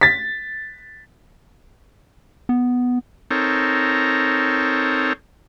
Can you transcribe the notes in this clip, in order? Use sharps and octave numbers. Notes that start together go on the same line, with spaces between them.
A6 B6
B3
C4 D#4 A4 A#4 C#5